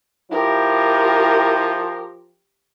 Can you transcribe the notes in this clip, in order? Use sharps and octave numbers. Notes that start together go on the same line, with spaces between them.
F3 E4 G4 A#4